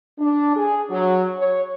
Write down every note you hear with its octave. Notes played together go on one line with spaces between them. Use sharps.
D4
G#4
F#3
C#5